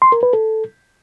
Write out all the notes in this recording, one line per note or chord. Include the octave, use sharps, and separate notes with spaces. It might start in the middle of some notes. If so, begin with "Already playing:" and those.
C6
A#4
B4
A4